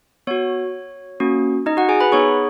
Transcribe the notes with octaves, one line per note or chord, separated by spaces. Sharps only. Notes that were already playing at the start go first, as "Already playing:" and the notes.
B3 F#4 C#5
A#3 C#4 F#4
D#4 D#5
F#4 F#5
G#4 G#5
B4 B5
B3 D#4 G#4 C#5 C#6